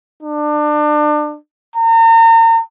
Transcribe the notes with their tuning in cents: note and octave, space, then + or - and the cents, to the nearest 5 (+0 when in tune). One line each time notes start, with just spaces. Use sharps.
D4 +30
A#5 -40